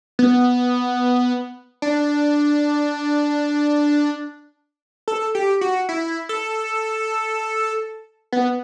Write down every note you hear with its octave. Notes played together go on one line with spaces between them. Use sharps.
B3
D4
A4
G4
F#4
E4
A4
B3